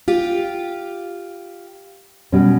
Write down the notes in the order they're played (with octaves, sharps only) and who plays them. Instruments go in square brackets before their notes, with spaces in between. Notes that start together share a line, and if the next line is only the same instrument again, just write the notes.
[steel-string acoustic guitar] F4 G4
[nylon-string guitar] B2 G3 C#4